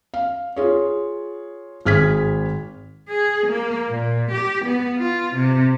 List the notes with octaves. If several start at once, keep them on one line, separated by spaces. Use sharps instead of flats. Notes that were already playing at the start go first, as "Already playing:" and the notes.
F5
F4 G#4 C#5
G#1 G#4 F6 G#6 B6
G#4
A#3
A#2
G4
B3
F4
C3